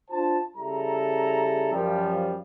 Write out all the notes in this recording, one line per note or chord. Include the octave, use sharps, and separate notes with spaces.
D4 F4 C5 A5
C#3 G3 E4 A4 A#5
F#2 F3 G3